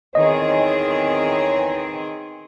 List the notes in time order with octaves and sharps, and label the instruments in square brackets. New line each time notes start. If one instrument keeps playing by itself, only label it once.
[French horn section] E2 B4 C#5 [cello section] D#3 C4 G#4 [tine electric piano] D#5